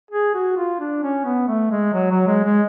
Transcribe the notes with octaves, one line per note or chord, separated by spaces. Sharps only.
G#4
F#4
F4
D4
C#4
B3
A3
G#3
F#3
F#3
G#3
G#3